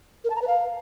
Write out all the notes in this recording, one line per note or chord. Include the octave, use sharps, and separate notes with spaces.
A#4
A5
A#5
B4
F5